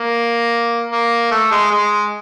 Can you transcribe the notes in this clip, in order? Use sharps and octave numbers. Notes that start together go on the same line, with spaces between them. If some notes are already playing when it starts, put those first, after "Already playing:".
Already playing: A#3
A#3
A3
G#3
G#3